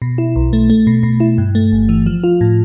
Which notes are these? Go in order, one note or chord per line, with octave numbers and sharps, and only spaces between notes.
B2
E4
B1
A3
A3
B2
B2
E4
G2
A3
G1
E3
F3
F4
A2